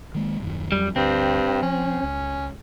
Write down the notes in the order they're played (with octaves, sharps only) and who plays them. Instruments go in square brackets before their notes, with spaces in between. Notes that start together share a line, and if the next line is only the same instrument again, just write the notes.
[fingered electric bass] D#3 G#3 A#3
D#1 F#2 D#3
[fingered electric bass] F2 F#3 [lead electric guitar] G3
[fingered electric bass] D2 [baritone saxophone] G2 [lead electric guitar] C4
[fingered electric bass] F3 [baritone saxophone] C#4
[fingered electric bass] C#2